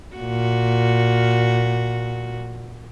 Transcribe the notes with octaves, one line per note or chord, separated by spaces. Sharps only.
A#2 F#4